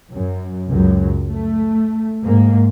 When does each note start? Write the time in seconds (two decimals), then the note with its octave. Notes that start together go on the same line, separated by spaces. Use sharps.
0.12 F#2
0.69 C#2 F#2 F#3
1.30 A3
2.24 G#2 A#3